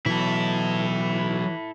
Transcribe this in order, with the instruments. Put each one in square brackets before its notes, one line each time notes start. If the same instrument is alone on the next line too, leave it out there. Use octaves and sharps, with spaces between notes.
[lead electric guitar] B2 F#3 [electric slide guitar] E3 [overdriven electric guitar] E4 A4